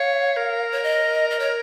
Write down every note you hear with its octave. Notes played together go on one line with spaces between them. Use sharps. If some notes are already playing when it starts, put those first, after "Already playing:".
Already playing: C#5 F5
A#4
C#5
D#5
D#5
C#5